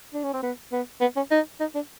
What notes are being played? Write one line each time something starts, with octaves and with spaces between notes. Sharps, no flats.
D4
C#4
C4
B3
B3
B3
C#4
D#4
D#4
D4